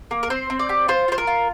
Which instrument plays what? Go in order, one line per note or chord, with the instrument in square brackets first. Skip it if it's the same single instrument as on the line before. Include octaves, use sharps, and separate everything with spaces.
[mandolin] A#3
A#4
C4 C5
C4
D5
G4
F4 C5
F4 C5
A#4
F4